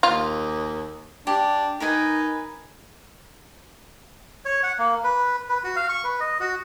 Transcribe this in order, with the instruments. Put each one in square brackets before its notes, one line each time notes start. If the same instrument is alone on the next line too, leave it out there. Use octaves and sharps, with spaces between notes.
[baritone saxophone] D#2 [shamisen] F4
[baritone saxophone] D4 [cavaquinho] G4
[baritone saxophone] D#4 [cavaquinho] A#4 B4 G#5
[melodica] C#5
F#5
A#3
B4
B4
F#4
F5
C#6
B4
D#5
F#4